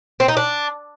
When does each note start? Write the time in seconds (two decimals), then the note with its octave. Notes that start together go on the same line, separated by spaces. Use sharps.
0.20 C4
0.28 D#4
0.37 D4